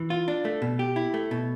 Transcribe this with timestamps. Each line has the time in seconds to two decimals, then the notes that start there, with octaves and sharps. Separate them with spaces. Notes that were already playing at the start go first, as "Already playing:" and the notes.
Already playing: E3
0.10 F4
0.28 D4
0.45 A3
0.62 B2
0.79 G4
0.96 E4
1.14 A3
1.31 B2